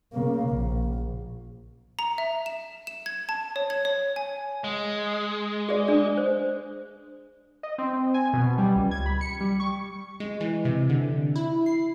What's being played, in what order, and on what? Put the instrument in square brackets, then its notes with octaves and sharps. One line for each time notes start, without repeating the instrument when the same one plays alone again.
[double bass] C#3 A#3
A#1
[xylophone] A#5
E5
E7
E7
G#6
A5
C#5
G#6
C#5
G#5
[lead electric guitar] G#3
[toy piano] G#4 D5
D4 G#4
C5
[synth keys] D#5
C4
C4
G#5
B2
G3
C#2
G#6
B5
C#7
G3
C#6
[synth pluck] G#3
E3
C3
D3
E4
C7